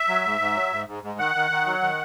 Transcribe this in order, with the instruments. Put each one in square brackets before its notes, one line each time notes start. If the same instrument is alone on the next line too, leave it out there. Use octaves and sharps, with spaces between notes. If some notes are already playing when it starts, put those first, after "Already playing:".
Already playing: [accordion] E5
F#3
G#2
G#2
F#3
G#2
G#2
G#2
D#3 F#5
D#3
D#3
F#3
D#3